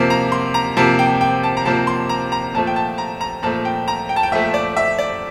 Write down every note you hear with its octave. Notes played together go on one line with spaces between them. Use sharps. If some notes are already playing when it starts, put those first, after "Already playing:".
Already playing: C3 F3 A#3
A#5
C6
A#5
C3 F3 A#3 A5
G5
G5
A5
A#5
C3 F3 A#3 A5
C6
A#5
A#5
A#2 F3 A3 A5
G5
A5
A#5
A#5
A#2 F3 A3 A5
G5
A#5
G5
A5
G5
A#2 F3 A3 E5
D5
E5
D5